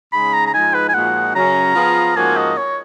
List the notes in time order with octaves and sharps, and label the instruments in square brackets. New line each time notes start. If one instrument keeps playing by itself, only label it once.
[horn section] C#3 G#3 D#4 G#4 [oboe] B5
[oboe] A#5
A#5
[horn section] G#2 F3 G#3 D#4 [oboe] G#5
[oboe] B4
G#5
[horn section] A#2 F3 G#3 D#4 F#4 [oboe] F#5
[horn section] F#2 C#3 F#3 C#4 [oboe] A#5
[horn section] F3 B3 F4 G#4
[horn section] G#2 F3 A#3 C#4 F#4 [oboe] G#5
[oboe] D#5
C#5